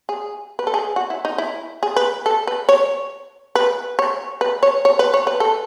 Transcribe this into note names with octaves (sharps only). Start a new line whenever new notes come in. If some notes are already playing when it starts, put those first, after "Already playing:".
G#4
B4
A4
G#4
F#4
E4
D#4
E4
G#4
B4
A4
B4
C#5
B4
C#5
B4
C#5
C#5
B4
C#5
B4
A4